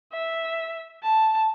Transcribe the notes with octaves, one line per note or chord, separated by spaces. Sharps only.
E5
A5